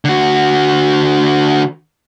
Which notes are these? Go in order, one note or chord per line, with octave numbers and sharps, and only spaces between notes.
D3 F#4